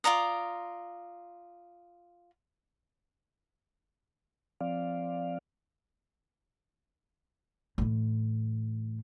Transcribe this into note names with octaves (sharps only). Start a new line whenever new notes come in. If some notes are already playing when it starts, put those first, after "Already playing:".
F4 D5 A#5 D#6
F3 C4 D5 F5
A2 E3